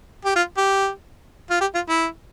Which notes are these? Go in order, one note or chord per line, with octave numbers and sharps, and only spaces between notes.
G4
F4
G4
F4
G4
F4
E4